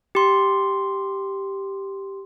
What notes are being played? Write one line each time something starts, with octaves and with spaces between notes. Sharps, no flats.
G4 C6